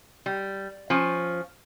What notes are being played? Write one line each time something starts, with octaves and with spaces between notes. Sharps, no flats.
G3
F3 C#4